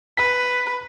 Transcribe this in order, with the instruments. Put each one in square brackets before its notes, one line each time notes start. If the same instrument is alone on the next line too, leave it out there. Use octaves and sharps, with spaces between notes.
[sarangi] B4 [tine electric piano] B6